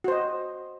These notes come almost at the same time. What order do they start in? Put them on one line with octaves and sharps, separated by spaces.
F#4 C5 D#5